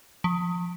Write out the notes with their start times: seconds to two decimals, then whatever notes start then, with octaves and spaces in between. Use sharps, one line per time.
0.24 F3